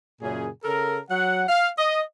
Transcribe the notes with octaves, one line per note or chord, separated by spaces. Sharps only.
F#2 A#2 C#3 G#4
C#3 A4 A#4
F#3 F#5
F5
D#5